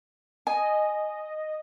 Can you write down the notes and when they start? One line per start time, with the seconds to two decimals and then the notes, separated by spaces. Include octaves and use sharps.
0.47 D#5 G#5